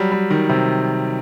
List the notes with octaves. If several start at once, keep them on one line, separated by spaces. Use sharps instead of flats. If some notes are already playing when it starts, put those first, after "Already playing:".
Already playing: F#3 G3
G3
D#3
C3